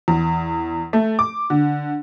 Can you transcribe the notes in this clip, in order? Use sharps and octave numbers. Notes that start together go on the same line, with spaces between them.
E2
A3
D6
D3